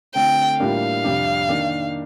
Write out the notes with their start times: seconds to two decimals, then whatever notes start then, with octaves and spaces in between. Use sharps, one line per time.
0.15 D3 A3 C4 F4 G5
0.60 A2 G3 A#3 D4 F4 F5
1.04 F2 C3 G3 D4
1.49 D#3 A#3 D4